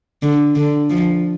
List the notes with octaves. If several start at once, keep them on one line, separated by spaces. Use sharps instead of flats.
D3
D3
F3